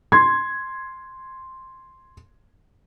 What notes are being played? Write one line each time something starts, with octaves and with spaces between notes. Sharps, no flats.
C6 G#6